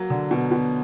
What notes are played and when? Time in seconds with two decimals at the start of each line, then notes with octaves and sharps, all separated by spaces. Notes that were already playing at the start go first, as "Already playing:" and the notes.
Already playing: F#3 A#3
0.10 D3
0.31 B2
0.52 B2